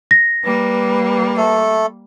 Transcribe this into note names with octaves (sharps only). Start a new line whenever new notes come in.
A#6
G3 A#3 B4
A3 A4